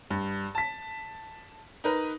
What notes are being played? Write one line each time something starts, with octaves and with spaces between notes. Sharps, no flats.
G2
A5 B6
D#4 A#4 B4